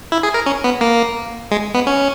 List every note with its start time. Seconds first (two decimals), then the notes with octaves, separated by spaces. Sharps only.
0.12 E4
0.23 G#4
0.34 A#4
0.46 C#4
0.64 B3
0.81 A#3
1.51 G#3
1.74 B3
1.87 C#4